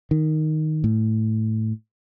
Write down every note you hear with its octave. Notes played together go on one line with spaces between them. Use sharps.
D#3
A2